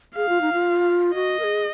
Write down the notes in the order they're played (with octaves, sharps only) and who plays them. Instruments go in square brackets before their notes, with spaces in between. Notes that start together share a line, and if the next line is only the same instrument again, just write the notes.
[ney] G#4 [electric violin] F5
[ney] F4
D#4
F4
[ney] F#4 [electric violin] D#5
[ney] A#4
G#4